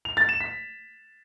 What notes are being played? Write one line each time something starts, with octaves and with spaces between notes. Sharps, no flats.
F7
A6
E7
B6